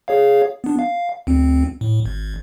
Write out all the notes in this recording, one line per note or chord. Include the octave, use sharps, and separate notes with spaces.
G#4 C#5 F5
B3 D4
F5
D2 C4
A2
G#1